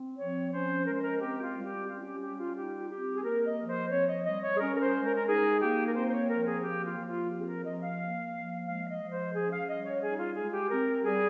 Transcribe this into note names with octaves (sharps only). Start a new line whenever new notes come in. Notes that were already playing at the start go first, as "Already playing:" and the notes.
Already playing: C4
F3 C#5
C#4 C5
G#3 A#4
C5
A#4
C4 G4
F4
G3
G4
C#4 F4
G4
G3 G4
F4
D#4 G4
F4
C4 G4
G#4
A#3 A#4
D#5
F3
C5
C4 C#5
D#5
G3 D#5
C#5
G#4
C#4 A#4
A#4
C5
G#3
A#4
A#4
D#4 G#4
A#3 G4
A#4
C4 C5
C5
C#5
F3 A#4
G#4
A#3 G4
F4
F3
F4
C4 G4
G#4
A#4
F3 D#5
F5
A#3
F3
G#3 F5
D#5
F3
C5
C#4 G#4
F5
G3 D#5
C#5
D#4 G#4
F4
G#3 G#4
G4
C4 A#4
G3 G#4